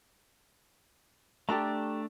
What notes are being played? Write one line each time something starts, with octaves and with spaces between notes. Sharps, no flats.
A3 D4 G4 A4 A#5